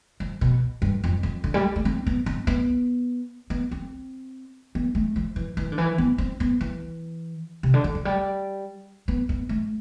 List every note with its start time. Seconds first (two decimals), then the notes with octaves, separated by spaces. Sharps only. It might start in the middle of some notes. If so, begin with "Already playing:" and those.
0.20 F3
0.41 B2
0.82 G2
1.04 F2
1.23 F2
1.44 D3
1.54 G3
1.76 A3
1.85 C4
2.07 B3
2.26 C4
2.47 B3
3.50 B3
3.71 C4
4.75 B3
4.95 A3
5.16 F3
5.36 E3
5.57 E3
5.72 D3
5.78 E3
5.98 B3
6.18 C4
6.40 B3
6.61 E3
7.63 C3
7.74 D3
7.84 D3
7.95 F3
8.05 G3
9.08 B3
9.29 B3
9.49 A3